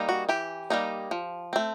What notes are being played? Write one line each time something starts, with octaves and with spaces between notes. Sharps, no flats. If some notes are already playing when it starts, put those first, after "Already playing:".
Already playing: G3 A#3 D#4
F#4
E3 G4
G3 A#3 D#4
F3
A3 C4